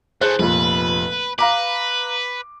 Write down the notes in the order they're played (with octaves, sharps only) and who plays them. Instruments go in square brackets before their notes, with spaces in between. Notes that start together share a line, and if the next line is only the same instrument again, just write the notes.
[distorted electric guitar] E3 A3 [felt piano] G#4 C5 F#6
[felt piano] F1 A#2 [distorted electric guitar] B4
[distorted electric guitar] B4 [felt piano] F5 A#5 D6